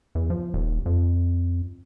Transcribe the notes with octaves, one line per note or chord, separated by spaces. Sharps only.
E2
F3
D#1
F2